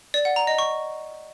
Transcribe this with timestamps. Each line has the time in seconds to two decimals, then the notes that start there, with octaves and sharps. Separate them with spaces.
0.14 D5
0.25 F#5
0.36 A#5
0.47 D#5
0.59 C#6